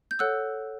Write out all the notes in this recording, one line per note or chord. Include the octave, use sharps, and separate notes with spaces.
G6
A4 C#5 F#5 E6 F#6